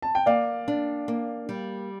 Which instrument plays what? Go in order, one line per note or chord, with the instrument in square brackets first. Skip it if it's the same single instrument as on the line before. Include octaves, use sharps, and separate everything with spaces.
[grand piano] A5
G5
[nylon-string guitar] A#3 [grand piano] D5 F5
[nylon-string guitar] D4
A#3
G3